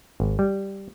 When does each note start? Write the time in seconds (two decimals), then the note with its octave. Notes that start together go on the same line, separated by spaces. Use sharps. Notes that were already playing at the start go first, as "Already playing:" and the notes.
0.20 G#1
0.39 G3